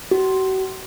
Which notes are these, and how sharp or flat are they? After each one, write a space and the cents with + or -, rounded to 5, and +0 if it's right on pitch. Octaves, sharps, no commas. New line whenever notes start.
F#4 +40